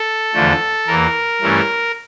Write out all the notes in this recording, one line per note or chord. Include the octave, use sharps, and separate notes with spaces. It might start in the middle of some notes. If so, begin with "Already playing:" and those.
Already playing: A4
E2 D3 F3 A3
E2 E3 A#3 A#4
G2 E3 A3 C#4